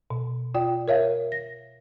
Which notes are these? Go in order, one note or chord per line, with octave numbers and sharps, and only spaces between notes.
B2
F4 D5 G5
A#4 C#5 E5 F5
A#6